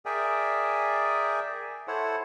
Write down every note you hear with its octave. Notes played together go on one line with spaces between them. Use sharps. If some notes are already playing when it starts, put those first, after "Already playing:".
G#4 A#4 D5 E5 G5 G#5
E4 A4 C5 C#5 F#5